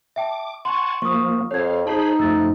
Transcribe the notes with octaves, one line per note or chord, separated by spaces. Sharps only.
E5 G5 A5 D6
F#5 G#5 A5 C6 C#6
F3 A#3 C#6 D#6
F2 C#5 F5 G#6
D#4 G#4 C5 A5 B5
F#2 F3 A3 E6 A6